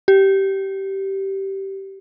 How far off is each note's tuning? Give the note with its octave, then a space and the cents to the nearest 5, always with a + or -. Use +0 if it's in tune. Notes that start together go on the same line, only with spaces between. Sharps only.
G4 -15